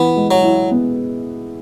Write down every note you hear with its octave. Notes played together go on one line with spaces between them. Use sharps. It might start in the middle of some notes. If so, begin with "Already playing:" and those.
Already playing: E3 B3
G#3
F#3
E4
B3